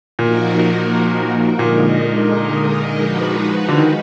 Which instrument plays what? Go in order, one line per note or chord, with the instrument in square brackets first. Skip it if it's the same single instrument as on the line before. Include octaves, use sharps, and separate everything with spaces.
[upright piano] A#2 [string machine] F3 A#3 D#4 F#4 A#4
[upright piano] A#2 [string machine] D3 G#3 D#4 A#4 D#5
[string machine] F3 G#3 D#4 F#4 B4
[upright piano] D3
D#3